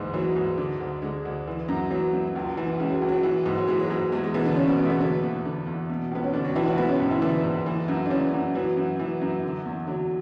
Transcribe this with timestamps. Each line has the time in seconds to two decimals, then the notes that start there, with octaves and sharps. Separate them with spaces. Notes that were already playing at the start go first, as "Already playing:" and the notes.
Already playing: D2 G#2 E3
0.14 E3 F#3
0.36 G#2
0.58 D3
0.80 D2
1.02 D3 G#3
1.25 D2
1.47 E3
1.68 F#2
1.90 E3 F#3
2.13 F#2
2.35 C#2
2.57 E3
2.80 C#3 G#3
2.89 F#3
3.01 C#2
3.09 F#3
3.23 E3
3.46 G#2
3.58 F#3
3.68 E3 G#3
3.79 F#3
3.90 G#2 G#3
4.12 E2 G#3
4.23 G#3
4.34 B2 E3 B3
4.45 D3 D4
4.56 C#3 C#4
4.68 B2 B3
4.78 E2 G#3
4.85 A3
4.90 B2 B3
5.01 B2 D3 B3
5.23 E2
5.45 D3
5.67 E2
5.90 B2
6.11 C#2 B3
6.24 C#4
6.33 B2 D3 D4
6.44 F#3 F#4
6.55 C#2 E3 E4
6.67 F#3 F#4
6.77 B2 E3 B3
6.88 C#3 C#4
7.00 G#2
7.11 E3 E4
7.22 D3 E3 D4
7.44 G#2
7.66 E3
7.88 F#2
8.06 D4
8.10 C#3 E3 C#4
8.33 F#2
8.55 E3 F#3
8.77 F#2
8.99 E3
9.21 F#2
9.43 D3
9.65 E2
9.87 D3 F#3